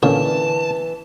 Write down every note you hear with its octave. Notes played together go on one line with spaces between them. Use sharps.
A#2 D3 E3 C#4 A5